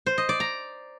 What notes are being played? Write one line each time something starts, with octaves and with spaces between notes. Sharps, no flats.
C5
D#5
D5
A#5